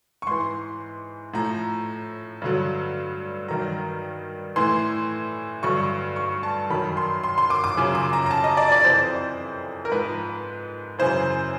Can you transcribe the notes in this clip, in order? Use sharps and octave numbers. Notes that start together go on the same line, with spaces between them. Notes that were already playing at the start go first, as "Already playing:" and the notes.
C#6
G#2 E3 C6
A2 F3 A#5
G2 D3 F#3
G2 D#3 F#3 A#5
A2 E3 C6
G2 D3 F#3 C#6
C#6
A5
F#2 D#3 F#3 B5
C6
C6
C6
D6
D6
F#2 C#3 F3
D6
A#5
A#5
A5
D#5
D5
D5
F2 C3 E3 C5
A#4
G#2 F3 B4
F#2 C#3 E3 C5